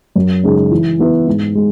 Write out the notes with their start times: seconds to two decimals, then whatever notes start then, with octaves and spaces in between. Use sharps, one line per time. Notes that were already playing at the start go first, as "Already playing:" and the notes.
0.16 F#2
0.44 C#3 G#3 D#4 G#4
0.71 E3
0.99 B3 E4 B4
1.27 G#2
1.55 G#3